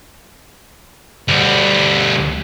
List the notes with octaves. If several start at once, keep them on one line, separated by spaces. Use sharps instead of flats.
D2 G3